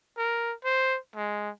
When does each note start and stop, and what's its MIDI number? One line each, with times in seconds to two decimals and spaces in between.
0.18 0.53 70
0.65 0.98 72
1.16 1.50 56